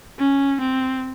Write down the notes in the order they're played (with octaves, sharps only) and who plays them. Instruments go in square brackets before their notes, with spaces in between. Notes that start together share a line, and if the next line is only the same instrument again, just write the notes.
[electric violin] C#4
C4